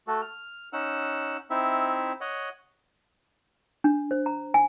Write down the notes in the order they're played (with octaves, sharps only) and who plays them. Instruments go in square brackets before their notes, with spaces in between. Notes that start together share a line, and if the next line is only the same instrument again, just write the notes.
[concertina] A3 F#4 A4
F6
C#4 D#4 F#5 E6
C4 D#4 E4 E5
C#5 D#5 F#5
[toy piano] D4
C5
A#5
G#5